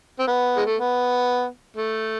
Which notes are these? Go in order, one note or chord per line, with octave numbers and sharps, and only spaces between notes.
C4
B3
G#3
A3
B3
A3